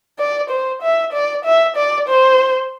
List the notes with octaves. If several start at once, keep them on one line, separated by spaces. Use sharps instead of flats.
D5
C5
E5
D5
E5
D5
C5